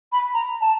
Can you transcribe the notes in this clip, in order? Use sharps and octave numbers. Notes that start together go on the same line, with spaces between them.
B5
A#5
A5